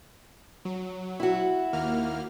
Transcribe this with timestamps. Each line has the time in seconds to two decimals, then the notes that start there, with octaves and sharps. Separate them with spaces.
0.65 F#3
1.20 E4 F#4
1.73 D#2 A#3 F6